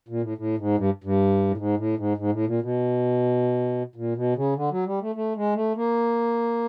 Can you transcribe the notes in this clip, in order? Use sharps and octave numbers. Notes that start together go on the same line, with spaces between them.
A#2
A2
A2
G#2
G2
G2
A2
G#2
A2
G#2
G#2
A2
A#2
B2
A#2
B2
C#3
D3
F#3
G3
A3
A3
G#3
A3
A#3